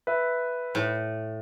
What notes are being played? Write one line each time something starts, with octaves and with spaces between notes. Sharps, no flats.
B4 E5
A2